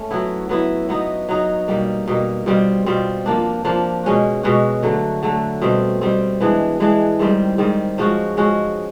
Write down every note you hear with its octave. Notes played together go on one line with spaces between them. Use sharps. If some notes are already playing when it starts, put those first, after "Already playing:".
Already playing: A3 C#4
F#3 B3 E4
F#3 B3 E4
F#3 B3 D#4
F#3 B3 D#4
B2 G3 A#3
B2 G3 A#3
B2 G3 C4 F4
B2 G3 C4 F4
F3 A#3 D4
F3 A#3 D4
B2 G#3 C#4 F#4
B2 G#3 C#4 F#4
D3 F#3 A3
D3 F#3 A3
B2 G3 C4
B2 G3 C4
E3 G#3 B3 D4
E3 G#3 B3 D4
G#2 D#3 G3 C4
G#2 D#3 G3 C4
F3 G#3 C#4 F#4
F3 G#3 C#4 F#4